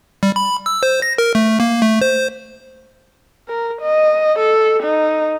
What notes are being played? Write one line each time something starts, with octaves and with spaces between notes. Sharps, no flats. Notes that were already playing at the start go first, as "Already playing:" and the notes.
G3
B5
E6
C5
A#6
A#4
A3
A#3
A3
C5
A#4
D#5
A4
D#4